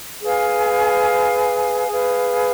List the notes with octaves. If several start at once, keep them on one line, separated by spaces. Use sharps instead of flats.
G#4 B4 F5 G#5
G#4 B4 F5